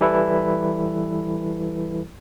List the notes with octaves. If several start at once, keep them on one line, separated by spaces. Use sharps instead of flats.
E3 G3 E4 A4 B4